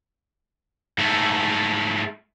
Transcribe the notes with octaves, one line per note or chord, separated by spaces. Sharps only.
G#2 A3